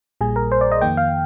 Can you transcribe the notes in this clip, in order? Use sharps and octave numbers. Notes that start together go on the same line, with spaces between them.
A#1 A#2 G3 G#4
A#4
C5
D5
D#5
F2 D#3 A#3 G5
F5